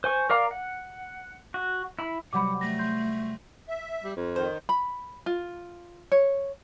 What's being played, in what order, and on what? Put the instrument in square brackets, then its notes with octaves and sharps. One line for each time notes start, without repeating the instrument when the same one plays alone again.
[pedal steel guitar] C5 G#5 C#6
A#4 D5 F5 A#5
F#5
F#4
E4 B5
[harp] C3 F#3 G3 [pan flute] F#5 [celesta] B5 D6
[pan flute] A3 [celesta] A#6
[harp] C6 G6
[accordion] E5
[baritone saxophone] G3
F2
[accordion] D#3 [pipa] C5
[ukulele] B5
F4
C#5